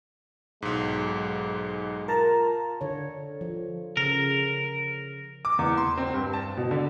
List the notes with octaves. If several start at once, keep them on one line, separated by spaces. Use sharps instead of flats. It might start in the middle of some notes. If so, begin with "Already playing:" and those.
B1 G#2 G#3
F4 A#4 A5 A#5
D3 C#5
F3
C#3 A#4
D6
E2
C6
C4
G2
A5
B2
D3